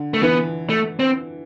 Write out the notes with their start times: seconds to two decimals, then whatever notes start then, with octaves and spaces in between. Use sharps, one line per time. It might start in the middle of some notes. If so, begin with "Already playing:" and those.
Already playing: D3
0.14 A3
0.23 E3 B3
0.70 A3
0.99 C4